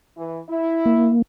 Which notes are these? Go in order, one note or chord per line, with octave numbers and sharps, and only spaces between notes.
E3
E4
A#3